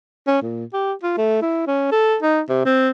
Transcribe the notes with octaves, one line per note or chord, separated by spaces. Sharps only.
C#4
A#2
G4
F4
A3
E4
C#4
A4
D#4
C3
C4